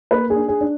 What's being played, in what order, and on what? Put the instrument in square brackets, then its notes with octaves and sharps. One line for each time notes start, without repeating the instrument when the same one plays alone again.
[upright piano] A#3 B4
G#4
D4
G#4
D4